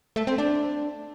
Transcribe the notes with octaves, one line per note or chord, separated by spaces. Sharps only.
A3
C4
D4